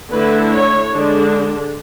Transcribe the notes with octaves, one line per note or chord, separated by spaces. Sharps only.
D3 A3 E4 B4
C#5
D3 G#3 D4